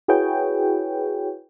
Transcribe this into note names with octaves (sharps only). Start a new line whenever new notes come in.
E4 F#4 G#4 B4 C#5 G5